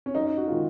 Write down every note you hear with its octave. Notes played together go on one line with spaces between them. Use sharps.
C#4
F#2 D#4
F#4
D#3 G#3 F4